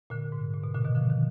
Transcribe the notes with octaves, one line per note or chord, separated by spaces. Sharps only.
A#2 D3
G#2
A#2
B2
A#2 D3
B2 D#3
D3 F3
B2 D#3